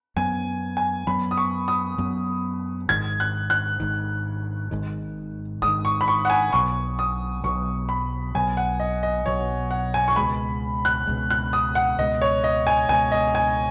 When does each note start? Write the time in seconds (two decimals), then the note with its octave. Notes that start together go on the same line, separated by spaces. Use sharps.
0.16 F#2 F#3 B3 G#5
0.77 G#5
1.07 F#2 F#3 B3 B5
1.31 D#6
1.37 C#6
1.68 D#6
1.98 F#2 F#3 B3
2.89 G#1 G#2 D#3 G#6
3.20 F#6
3.50 F#6
3.80 G#1 G#2 D#3
4.71 G#1 G#2 D#3
5.62 G#1 G#2 D#3 D#6
5.85 C#6
6.01 B5
6.08 C#6
6.25 F#5
6.30 G#5
6.53 B1 B2 F#3 C#6
6.99 D#6
7.44 B1 B2 F#3 C#6
7.89 B5
8.35 B1 B2 F#3 G#5
8.57 F#5
8.80 D#5
9.03 D#5
9.26 B1 B2 F#3 C#5
9.71 F#5
9.94 G#5
10.08 C#6
10.16 C#2 B2 G#3 B5
10.85 F#6
11.07 C#2 B2 G#3
11.30 F#6
11.53 D#6
11.75 F#5
11.98 C#2 B2 G#3 D#5
12.22 C#5
12.44 D#5
12.67 G#5
12.89 C#2 B2 G#3 G#5
13.12 D#5
13.35 G#5